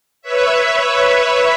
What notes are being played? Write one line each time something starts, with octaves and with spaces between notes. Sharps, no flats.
B4 C#5 E5